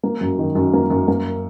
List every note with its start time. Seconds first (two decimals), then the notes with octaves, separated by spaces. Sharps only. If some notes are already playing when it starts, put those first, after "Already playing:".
0.03 A#3
0.21 F#2
0.38 D#3
0.55 F#2
0.74 A#3
0.90 F#2
1.08 A#3